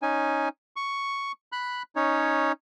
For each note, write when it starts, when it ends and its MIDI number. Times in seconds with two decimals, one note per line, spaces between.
0.02 0.49 61
0.02 0.49 63
0.02 0.49 80
0.76 1.32 85
1.52 1.83 83
1.52 1.83 90
1.96 2.52 61
1.96 2.52 63
1.96 2.52 73